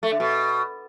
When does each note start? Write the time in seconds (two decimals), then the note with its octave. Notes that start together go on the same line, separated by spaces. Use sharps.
0.03 A3
0.11 D3
0.20 B2